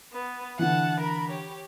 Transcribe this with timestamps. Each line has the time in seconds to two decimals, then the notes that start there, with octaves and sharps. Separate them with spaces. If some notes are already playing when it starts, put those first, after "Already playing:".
0.13 B3
0.59 D3 E3 F#5 A5
1.00 A#4 B5
1.30 G4 C#5